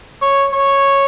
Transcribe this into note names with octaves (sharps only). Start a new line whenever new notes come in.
C#5
C#5